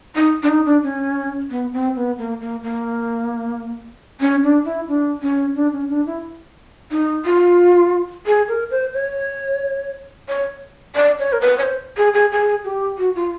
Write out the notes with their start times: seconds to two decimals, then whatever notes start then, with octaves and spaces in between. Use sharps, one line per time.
0.15 D#4
0.43 D4
0.49 D#4
0.66 D4
0.83 C#4
1.50 B3
1.73 C4
1.96 B3
2.18 A#3
2.41 A#3
2.63 A#3
4.20 C#4
4.43 D4
4.65 E4
4.88 D4
5.22 C#4
5.56 D4
5.73 C#4
5.89 D4
6.06 E4
6.91 D#4
7.25 F4
8.26 G#4
8.48 A#4
8.71 C5
8.94 C#5
10.29 C#5
10.96 D5
11.19 C#5
11.33 A#4
11.41 B4
11.58 C#5
11.63 C5
11.97 G#4
12.14 G#4
12.32 G#4
12.64 G4
12.98 F#4
13.15 F4